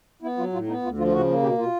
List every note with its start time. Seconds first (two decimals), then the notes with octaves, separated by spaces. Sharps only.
0.22 B3 E4
0.37 F#3 F4
0.52 A2 F4
0.67 B3 D#4
0.82 D2 F4
0.97 F3 F4
1.08 F4
1.13 C#3 F#4
1.27 A#3
1.42 B2 G4
1.58 B2 F4